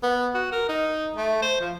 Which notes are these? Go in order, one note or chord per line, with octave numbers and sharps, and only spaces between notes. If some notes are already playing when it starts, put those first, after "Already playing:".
B3
F#4
A#4
D#4
A3
C5
F3